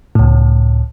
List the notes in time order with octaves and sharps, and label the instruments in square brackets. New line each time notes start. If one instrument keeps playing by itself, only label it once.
[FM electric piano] C#2 A2